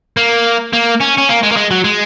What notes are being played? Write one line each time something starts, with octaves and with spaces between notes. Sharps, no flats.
A#3
A#3
C#4
C#4
A#3
G#3
A#3
G#3
F#3
G#3